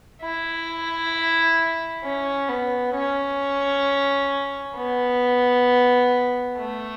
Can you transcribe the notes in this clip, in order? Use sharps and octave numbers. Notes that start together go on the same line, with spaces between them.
E4
C#4
B3
C#4
B3
A3